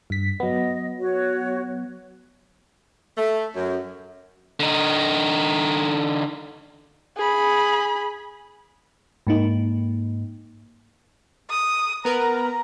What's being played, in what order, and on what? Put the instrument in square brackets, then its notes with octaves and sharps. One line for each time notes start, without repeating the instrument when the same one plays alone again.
[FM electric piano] G2 B6
[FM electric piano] F#3 B3 [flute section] D#5
[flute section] F#4 C#5
[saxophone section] A3
F#2
[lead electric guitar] D3 D#4
[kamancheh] G#4 B5
[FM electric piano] G#2 A#3 D#4
[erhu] D#6
[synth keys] B3 A#4 B4 [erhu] A#5